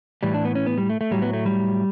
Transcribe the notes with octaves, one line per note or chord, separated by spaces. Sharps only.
A2 E3 G3
D4
B3
C#4
B3
G3
A3
A3
A2 F#3 G3
B3
A3
G3